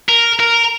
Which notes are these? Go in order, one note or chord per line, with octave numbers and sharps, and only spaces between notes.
A#4
A#4